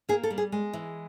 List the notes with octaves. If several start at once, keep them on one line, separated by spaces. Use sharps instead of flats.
A#3 G#4
A4
G3
G#4
G#3
E3